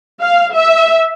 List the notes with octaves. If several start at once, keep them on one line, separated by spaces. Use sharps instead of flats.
F5
E5